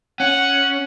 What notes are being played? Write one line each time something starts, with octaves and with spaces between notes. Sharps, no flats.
C#4 F#5